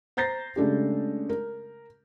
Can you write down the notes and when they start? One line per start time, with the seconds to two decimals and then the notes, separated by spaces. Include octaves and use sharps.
0.17 C5 A#5 G6 A6 A#6 C7
0.56 C#3 G#3 A3 D4 G4
1.29 A#4